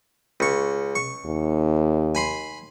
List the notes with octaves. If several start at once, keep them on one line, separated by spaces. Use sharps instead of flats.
C#2 C#6
C#6
D#2
G#5 B5 C6